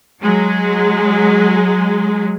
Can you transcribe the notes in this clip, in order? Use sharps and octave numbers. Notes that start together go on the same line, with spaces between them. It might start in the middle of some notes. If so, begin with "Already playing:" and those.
F#3 G#3